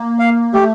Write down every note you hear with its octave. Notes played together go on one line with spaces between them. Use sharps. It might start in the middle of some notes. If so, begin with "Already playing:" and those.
Already playing: A#3
F5
A3 G4